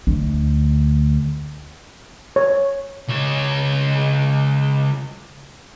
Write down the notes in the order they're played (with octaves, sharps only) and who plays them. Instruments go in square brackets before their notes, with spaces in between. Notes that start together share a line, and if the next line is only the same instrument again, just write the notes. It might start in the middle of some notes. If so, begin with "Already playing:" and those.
[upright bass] D2
[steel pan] C#5
[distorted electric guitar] C#2 C#5